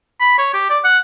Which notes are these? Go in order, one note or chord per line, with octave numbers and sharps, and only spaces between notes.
B5
C#5
G4
D5
F#5